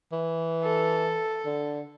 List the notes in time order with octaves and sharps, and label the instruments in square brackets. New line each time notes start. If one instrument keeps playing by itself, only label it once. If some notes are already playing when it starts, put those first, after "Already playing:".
[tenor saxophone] E3
[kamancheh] A4
[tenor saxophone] D3